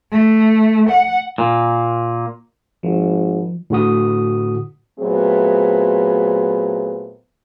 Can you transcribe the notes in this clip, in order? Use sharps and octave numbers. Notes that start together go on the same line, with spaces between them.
A3
F#5
A#2
G#1 F3
A2 D3 F#4 D#6
A#2 F#3 A3 B3 C4 G#4